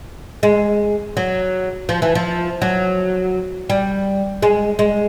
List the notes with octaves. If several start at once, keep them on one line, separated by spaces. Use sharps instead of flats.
G#3
F#3
F3
E3
F3
F#3
G3
G#3
G#3